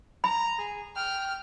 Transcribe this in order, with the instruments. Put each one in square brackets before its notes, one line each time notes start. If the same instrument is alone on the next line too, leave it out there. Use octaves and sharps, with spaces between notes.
[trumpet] A#5 [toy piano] B5
[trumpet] G#4
[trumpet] G5 [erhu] F6